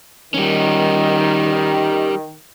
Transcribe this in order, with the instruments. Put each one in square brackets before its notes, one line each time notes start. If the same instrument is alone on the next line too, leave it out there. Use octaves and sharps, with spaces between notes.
[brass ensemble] D#3 [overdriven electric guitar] G3 C#4